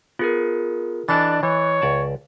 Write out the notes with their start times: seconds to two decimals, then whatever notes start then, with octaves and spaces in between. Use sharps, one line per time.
0.19 B3 F4 G#4 A#4
1.09 E3 D4 A4 D5 D#5 F#6 A6
1.43 E3 C#5
1.82 C#2 D5 A5